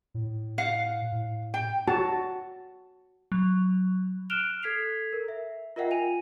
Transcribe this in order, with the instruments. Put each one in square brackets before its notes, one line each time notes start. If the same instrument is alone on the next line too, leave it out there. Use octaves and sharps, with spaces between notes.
[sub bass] A2
[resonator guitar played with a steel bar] F5 F#5
[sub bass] A2
[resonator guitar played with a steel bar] G5
[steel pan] F#4 A5
[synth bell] F#3
[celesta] F6 F#6 D7 E7 F7 G7
A4 G#6 B6 C7 F7
A#4
E5
F4 A#4 D#5 E5 F#5 G5
F4 G#5 D#7 F7